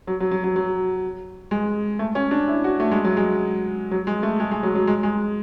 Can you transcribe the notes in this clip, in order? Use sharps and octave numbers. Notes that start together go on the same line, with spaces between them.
F#3
F#3
F#3
F#3
F#3
G#3
A3
C#4
D4
E4
F#4
A3
G#3
F#3
G#3
F#3
G#3
A3
G#3
G#3
F#3
F#3
G#3
G#3